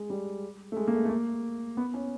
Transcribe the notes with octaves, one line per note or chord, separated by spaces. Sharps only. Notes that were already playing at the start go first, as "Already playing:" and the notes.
Already playing: G#3
G3
A3
G#3
A#3
A3
A3
A#3
B3
C#4